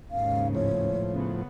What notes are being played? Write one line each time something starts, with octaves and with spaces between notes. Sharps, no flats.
D#2 G#2 C#3 F5
A2 F3 C#5
C#3 B3